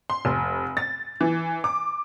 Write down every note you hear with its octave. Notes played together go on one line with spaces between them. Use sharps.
C6
F1
A6
E3
D6